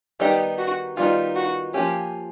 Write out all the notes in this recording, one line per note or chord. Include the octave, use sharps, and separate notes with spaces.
D#3 G3 B3 D#4 G4
F#4
D#3 G3 B3 D#4 F4
F#4
F3 A#3 C#4 G4